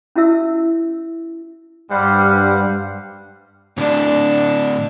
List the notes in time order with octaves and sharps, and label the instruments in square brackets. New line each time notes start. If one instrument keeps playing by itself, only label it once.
[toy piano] C#4 E4 F#4 E5 E6
[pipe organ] G2 [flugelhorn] G3 [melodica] C5 F5 F#5
[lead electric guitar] A2 D3 [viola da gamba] D4